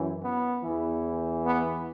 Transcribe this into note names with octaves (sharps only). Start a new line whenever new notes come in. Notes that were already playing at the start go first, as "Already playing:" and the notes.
Already playing: F#2 E3
B3
E2 E3
B3